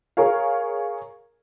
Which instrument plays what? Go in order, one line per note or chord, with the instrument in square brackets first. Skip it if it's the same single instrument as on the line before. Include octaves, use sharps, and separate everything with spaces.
[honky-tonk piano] G#4 A#4 C#5 F5